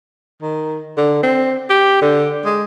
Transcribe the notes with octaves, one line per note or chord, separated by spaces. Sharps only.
D#3
D3
C4
G4
D3
G#3